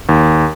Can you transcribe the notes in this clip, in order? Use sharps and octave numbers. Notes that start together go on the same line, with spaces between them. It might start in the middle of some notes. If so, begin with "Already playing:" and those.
D#2